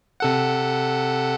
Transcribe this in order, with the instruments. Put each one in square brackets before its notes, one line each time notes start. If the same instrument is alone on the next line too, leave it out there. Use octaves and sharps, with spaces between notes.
[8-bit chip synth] C3 A4 F#5